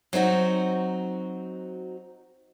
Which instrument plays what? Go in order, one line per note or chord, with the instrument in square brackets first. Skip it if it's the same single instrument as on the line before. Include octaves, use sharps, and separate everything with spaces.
[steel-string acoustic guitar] F#3 C4 D#4 F#4